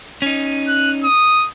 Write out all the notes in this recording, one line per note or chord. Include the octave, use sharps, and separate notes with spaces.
C#4 D#4
F#6
D#6